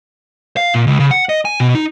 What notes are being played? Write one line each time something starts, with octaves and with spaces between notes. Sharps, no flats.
F5
A#2
C#2
C#3
F#5
D#5
G#5
B2
D#4